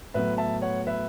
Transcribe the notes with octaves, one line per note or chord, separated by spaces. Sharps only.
A2 F#3 B3 B4 E5
E5 A5
C#5 F#5
B4 E5